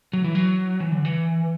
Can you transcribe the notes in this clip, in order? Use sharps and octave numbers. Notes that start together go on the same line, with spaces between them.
F#3
E3
F#3
E3
D3
E3